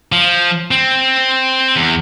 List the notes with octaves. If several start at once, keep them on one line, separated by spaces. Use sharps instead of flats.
F3
C4
E2